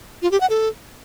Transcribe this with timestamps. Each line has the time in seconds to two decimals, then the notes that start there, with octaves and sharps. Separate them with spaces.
0.22 F4
0.31 G4
0.41 F#5
0.50 A4